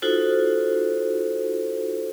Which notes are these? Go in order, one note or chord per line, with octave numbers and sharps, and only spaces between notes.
D#4 F4 F#4 A4 C5